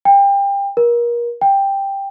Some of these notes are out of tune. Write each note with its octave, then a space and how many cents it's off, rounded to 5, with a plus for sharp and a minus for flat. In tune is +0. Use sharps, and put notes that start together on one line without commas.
G5 +30
A#4 +30
G5 +10